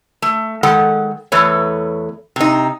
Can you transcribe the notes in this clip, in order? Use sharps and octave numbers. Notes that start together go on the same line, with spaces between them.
A3
D#3 G#3 A4 F#5
E2 A3 A4 B4 C#5
C3 D#4